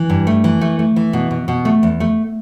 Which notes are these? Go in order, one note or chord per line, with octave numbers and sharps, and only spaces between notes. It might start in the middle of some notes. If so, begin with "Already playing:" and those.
Already playing: E3
G2
A3
E3
A3
A3
E3
B2
B2
B2
A3
E2
A3